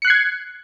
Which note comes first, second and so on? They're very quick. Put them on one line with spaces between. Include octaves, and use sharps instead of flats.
C#7 F#6 C7 G#6